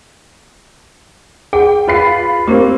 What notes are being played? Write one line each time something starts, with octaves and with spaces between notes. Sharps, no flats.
G#4 F#5 G5
F4 B4 C7
A#3 C4 G4 A#4